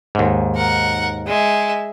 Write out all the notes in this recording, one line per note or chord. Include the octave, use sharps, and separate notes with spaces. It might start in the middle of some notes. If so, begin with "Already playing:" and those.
D#2 G#2
A#4 F#5
G#3 E5